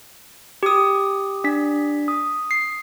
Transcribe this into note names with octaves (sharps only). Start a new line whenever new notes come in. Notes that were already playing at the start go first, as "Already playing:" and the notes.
G4 D#6
D4 B6
D#6
C7